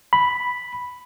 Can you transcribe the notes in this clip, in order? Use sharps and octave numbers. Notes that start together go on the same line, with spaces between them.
B5